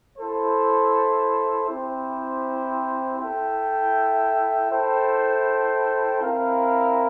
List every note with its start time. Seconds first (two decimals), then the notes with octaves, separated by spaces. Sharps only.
0.18 E4 A4 C5
1.69 C4 E4 G4 C5
3.20 E4 A4 E5 G5
4.70 E4 A4 C5 G5
6.21 C4 E4 A#4 F5